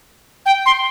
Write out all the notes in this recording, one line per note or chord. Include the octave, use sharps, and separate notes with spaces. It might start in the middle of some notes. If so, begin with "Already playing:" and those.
G5
C6